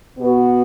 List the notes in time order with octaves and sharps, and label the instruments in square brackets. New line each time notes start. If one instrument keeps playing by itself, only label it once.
[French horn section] B2 B3 F#4